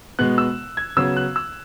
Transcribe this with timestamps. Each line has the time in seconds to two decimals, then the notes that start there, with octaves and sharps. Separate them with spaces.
0.19 B2 G#3 B3 F#6
0.38 E6
0.77 G#6
0.96 C#3 F#3 B3 E6
1.17 F#6
1.36 E6